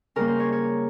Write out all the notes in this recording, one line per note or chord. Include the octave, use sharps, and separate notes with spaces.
C#3 G3 A#3 A#4
C5
C#5
C#5